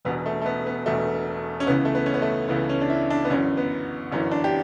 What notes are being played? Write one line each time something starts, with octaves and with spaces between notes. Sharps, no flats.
E1 E2 B2 B3
A3
A3
B3
B3
E1 E2 B2 A3
C#4
C#2 C#3 E3 B3
A3
B3
C#4
B3
A3
C#2 C#3 E3 B3
C#4
D4
E4
D4
B3
G1 F#2 E3 C#4
B3
G1 F#2 E3 C#4
D4
G4